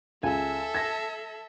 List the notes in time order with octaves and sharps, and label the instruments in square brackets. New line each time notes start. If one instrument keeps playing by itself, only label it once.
[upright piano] C#2 [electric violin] A4 E5 [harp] G#5
[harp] A5 [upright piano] G#6 A#6